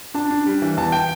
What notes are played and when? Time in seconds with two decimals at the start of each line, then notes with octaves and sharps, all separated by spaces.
0.14 D4 A5
0.30 D4
0.46 G3
0.62 E3
0.77 E2 A5
0.92 G5